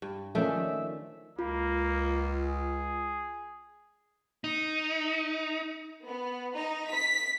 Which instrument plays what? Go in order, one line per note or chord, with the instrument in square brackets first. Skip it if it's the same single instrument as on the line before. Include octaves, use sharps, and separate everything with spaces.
[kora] G2
[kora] D#3 A3 D4 [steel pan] F3 C#4 [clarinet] E5
[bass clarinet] C#2 [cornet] A#3 [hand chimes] F4
[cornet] G#4
[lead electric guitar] D#4
[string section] B3
D#4
B6